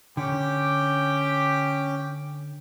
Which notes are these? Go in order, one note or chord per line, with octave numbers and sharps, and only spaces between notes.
D3 C#4 G4 G5 D6